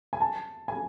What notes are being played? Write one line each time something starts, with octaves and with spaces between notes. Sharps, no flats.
G#5
A5
G#5